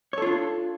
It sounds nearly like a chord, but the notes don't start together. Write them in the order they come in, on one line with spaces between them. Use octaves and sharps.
C#5 A4 F4 D4